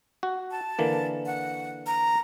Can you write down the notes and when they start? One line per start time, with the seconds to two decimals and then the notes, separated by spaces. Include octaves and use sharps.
0.23 F#4
0.51 A5
0.79 D3 E3 A#3
1.26 F#5
1.87 A#5